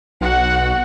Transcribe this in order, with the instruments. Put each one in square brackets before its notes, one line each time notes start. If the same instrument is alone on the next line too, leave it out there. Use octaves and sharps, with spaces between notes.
[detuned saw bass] B1 [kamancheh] F#4 F#5